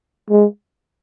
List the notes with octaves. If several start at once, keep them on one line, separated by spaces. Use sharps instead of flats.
G#3